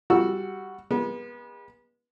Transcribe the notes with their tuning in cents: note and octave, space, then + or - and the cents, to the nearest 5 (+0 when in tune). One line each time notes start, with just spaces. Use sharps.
G3 +0 F#4 +0 E6 +0
G#3 -35 B3 -35